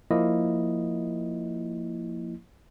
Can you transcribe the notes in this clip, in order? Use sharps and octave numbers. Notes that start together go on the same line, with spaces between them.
F3 A#3 E4 D#5